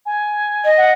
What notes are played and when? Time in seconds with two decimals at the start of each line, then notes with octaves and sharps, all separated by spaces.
0.06 G#5
0.65 D#5
0.77 F#5